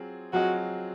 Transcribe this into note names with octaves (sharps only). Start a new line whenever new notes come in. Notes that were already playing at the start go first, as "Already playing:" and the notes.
Already playing: F#3 C4 F4 G#4
F#3 C4 F4 F#4 G#4 D#5